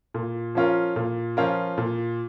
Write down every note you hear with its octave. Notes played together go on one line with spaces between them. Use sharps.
A#2
F3 C#4 F4 A#4
A#2
F3 C#4 F4 A#4
A#2